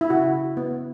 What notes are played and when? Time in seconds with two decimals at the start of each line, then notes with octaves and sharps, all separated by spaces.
0.01 E4
0.10 C#3 F#4
0.57 B3